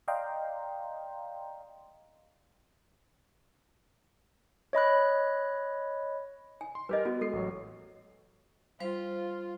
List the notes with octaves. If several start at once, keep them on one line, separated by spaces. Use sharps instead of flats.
D5 D#5 F5 G5 A#5 C6
C#5 D#5 B5 F#6
G#5
C6
G3 G4 A#4 B4 D#5
B3 F#4
G#3 A4 C7
A1 F#3 C#5
G3 F4 C5 F5